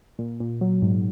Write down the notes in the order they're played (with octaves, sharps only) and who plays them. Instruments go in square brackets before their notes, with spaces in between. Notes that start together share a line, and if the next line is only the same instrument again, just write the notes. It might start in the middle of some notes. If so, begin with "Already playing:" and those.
[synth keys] A#2
A#2
F#3
G#2